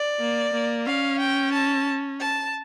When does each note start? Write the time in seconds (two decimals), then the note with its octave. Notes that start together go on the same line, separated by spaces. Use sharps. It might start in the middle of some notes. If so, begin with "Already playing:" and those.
Already playing: D5
0.19 A#3
0.53 A#3
0.86 C#4 F5
1.19 G5
1.52 A5
2.20 A5